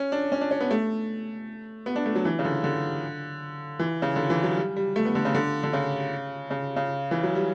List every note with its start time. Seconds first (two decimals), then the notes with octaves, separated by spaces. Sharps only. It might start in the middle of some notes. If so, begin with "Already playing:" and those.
Already playing: C#4
0.12 D4
0.32 C#4
0.41 D4
0.51 C#4
0.60 B3
0.71 A3
1.86 B3
1.96 D4
2.06 A3
2.15 F#3
2.25 E3
2.39 C#3
2.45 D3
2.64 D3
3.79 E3
4.02 C#3
4.16 D3
4.30 E3
4.43 F#3
4.57 G3
4.76 G3
4.96 A3
5.05 B3
5.15 D3
5.25 C#3
5.35 D3
5.63 D3
5.73 C#3
6.50 C#3
6.76 C#3
7.11 E3
7.23 F#3
7.35 G3